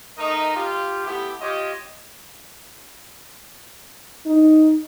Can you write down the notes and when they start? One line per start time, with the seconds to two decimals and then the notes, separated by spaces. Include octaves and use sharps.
0.18 A3 D#4 A#4 D#5
0.54 F4 G4
1.06 A3 B3 E4 G4
1.41 F4 G4 C#5 D#5
4.26 D#4